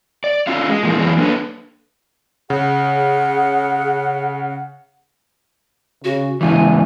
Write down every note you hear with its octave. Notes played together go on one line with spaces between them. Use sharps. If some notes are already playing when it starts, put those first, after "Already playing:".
D5
C#4 F4 F#4 F5
G#3
A#2 E3 F3 G3 G#3 A#3
F2 E3 F#3 G#4
A#3 D4 A4 B4
C#3 G#4 F#5
C#3 F#4
G#2 C#3 E3 E4 G#5